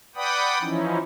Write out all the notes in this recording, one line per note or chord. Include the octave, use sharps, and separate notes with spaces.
B4 D5 F#5 G5 B5 D#6
E3 F3 C#4 D#4 E4